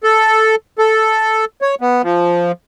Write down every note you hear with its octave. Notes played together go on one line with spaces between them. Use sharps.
A4
A4
C#5
B3
F3